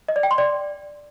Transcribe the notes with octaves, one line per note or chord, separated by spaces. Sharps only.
D#5
D5
G5
C6
D5